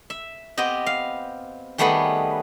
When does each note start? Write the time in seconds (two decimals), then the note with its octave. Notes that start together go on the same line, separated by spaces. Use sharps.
0.10 E5
0.57 B3 C4 G4 D#5
0.86 F5
1.78 D#3 G3 A3 B3 G#4 B4